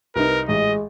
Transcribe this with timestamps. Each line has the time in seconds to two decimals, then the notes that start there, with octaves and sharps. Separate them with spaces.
0.16 C2 D#4 A#4 B4
0.49 A1 G#3 D#5